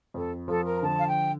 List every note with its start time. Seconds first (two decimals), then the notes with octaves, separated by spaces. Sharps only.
0.14 F2 A4
0.48 F3 A4
0.65 A#4
0.76 A#5
0.83 D3 A5
0.98 F5
1.06 G5